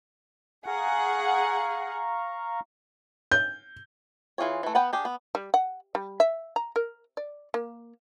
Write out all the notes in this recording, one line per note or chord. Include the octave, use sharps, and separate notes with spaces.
G#4 F5 F#5 A#5 C#6
G6
E3 F4 G#4 C#5
E3 A3
B3 B4 F#5 G5
D4 G4 G#4
B3
G3
F#5
G3
E5
A#5
A#4
D5
A#3